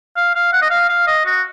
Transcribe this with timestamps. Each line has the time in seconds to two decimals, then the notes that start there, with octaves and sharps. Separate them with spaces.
0.17 F5
0.35 F5
0.53 F#5
0.62 D#5
0.70 F5
0.89 F5
1.07 D#5
1.25 F#4